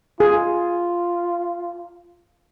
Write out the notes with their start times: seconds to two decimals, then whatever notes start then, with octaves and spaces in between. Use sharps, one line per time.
0.20 F4 G#4